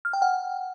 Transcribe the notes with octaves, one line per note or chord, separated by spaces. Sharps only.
F6
G5
F#5